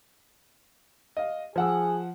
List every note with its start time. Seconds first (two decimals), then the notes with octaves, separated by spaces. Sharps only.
1.17 D#5 F5
1.56 F3 G#4 F#5 E6